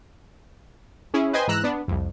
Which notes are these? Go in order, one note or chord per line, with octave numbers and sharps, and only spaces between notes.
C#4 E4 G#4
B4 C5 D#5 G5 G#5 C6
G#2 E3 A#5 E6 F#6
B3 D4
C2 F2